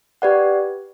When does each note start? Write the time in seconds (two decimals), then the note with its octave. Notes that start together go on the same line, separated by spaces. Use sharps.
0.22 G4 B4 D5 F#5